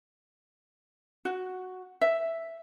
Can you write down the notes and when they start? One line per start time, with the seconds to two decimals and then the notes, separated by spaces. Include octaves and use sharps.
1.25 F#4
2.01 E5